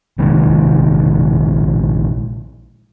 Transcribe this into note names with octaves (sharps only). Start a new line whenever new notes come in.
A#1 C3 D#3 G#3